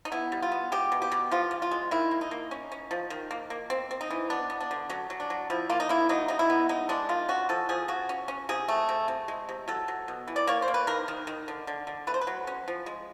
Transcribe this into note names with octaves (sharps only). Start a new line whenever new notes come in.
D#4
B3 E4
G3
F4
B3
G#3 G4
B2
G4
B2
F3 F4
C#3
F4
G#3
D#3 E4
A#3
D#4
A#3
C#4
C#4
F3
D#3
A#3
A#3
C4
C4
D#4
E3
B3 D4
B3
D4
D3
F#3 C#4
F#3
D4
F#3
F3 E4
A#3 F4
D#4
A#3 E4
F#3 D#4
C#3 D#4
E4
B3
G#3 D#4
G#3 D4
D#3 F4
C#4 F#4
F3 A4
F3 G#4
C#3 F#4
C#4
C#4
C3 G#4
A3
C3
C3
G#3
C3
F#3 A4
F#3
B2
E3
D5
A#3 C#5
C5
A#3
B4
D#3 A#4
D#3
D#3
D3
D3
D3
A3 B4
C5
B4
F#3
C#4
F3
G#3